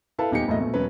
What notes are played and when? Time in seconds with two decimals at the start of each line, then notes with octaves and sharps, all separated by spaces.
0.19 E4 A4 B4 F5 A5
0.31 D#1 E2 D#4 G4 C#7
0.48 E1 A2 A3 D#5
0.60 A#1 B2 A3
0.74 E1 F#3 B3 C#4 B4